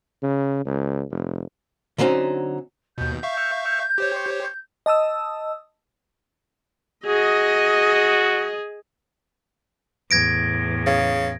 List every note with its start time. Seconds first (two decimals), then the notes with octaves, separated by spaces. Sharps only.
0.22 C#3
0.65 C#2
1.10 F1
1.98 D3 F#3 C4 C#4 D#4
2.98 D#2 B2 G6
3.23 E5 F5 C#6
3.98 G4 C5 C#5
4.86 D#5 A5 D#6 E6
7.06 F#4 G#4 D#5
10.11 E2 A2 G#6 A#6 D7
10.86 C#3